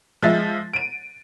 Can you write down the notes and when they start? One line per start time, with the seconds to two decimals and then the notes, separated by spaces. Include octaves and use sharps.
0.22 F3 G#3 E5 A6
0.73 D7 D#7